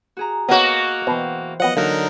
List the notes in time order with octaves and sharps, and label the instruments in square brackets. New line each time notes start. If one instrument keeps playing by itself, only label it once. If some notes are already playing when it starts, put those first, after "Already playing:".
[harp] F#4 G#4 A#5
[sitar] A#3 F#4 [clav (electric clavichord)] B3 C#5 [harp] D#5
[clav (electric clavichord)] B2 [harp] E3 C5 G5
[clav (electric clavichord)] F3 F#3 B3 [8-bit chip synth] D#5 F#5
[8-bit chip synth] D3 D#4 A#4 [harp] F#3 F#4 [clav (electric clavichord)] A#3